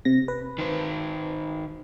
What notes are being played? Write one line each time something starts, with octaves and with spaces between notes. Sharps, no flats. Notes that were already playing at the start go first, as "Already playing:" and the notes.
C3 A#6
B4
D#3 C5